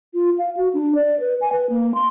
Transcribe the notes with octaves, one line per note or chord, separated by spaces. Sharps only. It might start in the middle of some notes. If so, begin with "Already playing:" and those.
F4
F5
F#4
D4
D5
B4
G#5
B4
A#3
C6